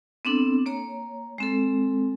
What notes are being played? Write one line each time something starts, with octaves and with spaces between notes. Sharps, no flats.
B3 C4 D4 A4
A#3 C#5 A#5
G#3 C4 A4